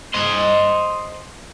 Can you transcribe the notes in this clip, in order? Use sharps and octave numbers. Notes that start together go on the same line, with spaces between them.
C5 D#5